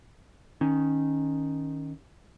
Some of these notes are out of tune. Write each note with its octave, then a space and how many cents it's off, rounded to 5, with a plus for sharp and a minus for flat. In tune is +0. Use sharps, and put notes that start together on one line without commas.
D#3 +0 C#4 +0